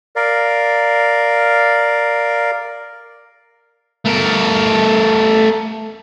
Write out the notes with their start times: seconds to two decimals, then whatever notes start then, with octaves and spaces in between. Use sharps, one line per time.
0.16 A#4 D5 F5
4.05 A3 A#4